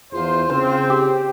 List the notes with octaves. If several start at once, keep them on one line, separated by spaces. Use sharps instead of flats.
E2 F4 C5
C#3 C4 C5
G4